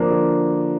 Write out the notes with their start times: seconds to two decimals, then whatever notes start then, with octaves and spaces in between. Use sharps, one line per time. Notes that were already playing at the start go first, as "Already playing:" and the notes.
Already playing: D3 F3 A#3 D4
0.11 D3